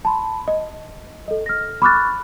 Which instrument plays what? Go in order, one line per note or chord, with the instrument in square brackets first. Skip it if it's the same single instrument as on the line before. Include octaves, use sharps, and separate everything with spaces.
[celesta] A5 B5 C6
D#5
A4 D#5
F6 A#6
B5 C#6 D6 F6 F#6 A6